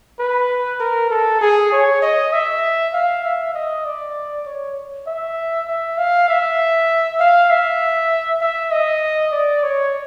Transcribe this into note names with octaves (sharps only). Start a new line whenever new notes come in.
B4
A#4
A4
G#4
C#5
D#5
E5
F5
E5
D#5
D5
C#5
E5
E5
F5
E5
F5
E5
E5
D#5
D5
C#5